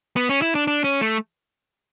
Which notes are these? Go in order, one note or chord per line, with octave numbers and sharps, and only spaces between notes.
B3
C#4
E4
D4
D4
C#4
A3